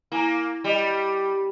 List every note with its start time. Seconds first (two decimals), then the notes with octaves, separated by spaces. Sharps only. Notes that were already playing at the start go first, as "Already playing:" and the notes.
0.12 A#3 E4 G#5 A#5
0.64 G3 D#5